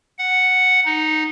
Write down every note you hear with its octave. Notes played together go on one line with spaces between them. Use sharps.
F#5
D#4